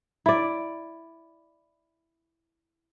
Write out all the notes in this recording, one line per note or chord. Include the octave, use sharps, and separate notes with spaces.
E4 D5